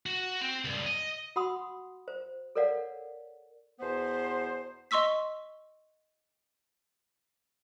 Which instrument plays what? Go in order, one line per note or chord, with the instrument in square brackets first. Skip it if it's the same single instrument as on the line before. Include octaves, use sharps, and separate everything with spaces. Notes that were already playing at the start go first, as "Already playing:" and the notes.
[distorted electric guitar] F#4
C4
C#2 G2
D#5
[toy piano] F#4 F#5 B5 C6 D#6 E6
C5
A4 A#4 C#5 D5 F5 F#5
[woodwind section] E2 B2 B3 C5
[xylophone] D#5 C6 C#6 E6 B6